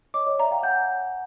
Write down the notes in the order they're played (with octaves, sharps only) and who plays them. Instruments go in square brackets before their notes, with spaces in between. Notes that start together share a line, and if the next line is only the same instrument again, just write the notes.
[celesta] C#5 D#5 [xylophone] D6
[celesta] C#5 D#5
[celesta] D5 E5 [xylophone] A#5
[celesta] F5 G5
[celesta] F#5 G#5 [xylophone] G6